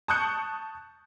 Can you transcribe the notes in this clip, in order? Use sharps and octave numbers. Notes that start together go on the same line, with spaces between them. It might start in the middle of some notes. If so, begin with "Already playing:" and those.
A5 C#6 D#6 F#6 G6 C#7